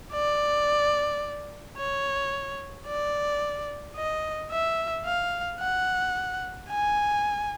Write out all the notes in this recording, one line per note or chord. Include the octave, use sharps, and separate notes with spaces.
D5
C#5
D5
D#5
E5
F5
F#5
G#5